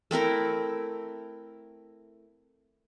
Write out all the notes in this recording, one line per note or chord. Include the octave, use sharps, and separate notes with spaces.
A3 C4 E4 A#4